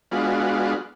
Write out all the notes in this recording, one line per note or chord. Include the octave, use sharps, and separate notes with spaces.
G#3 B3 D4 F4 F#4